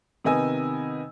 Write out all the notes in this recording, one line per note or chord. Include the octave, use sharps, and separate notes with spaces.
C3 D#3 B3 D#5 G#5 E6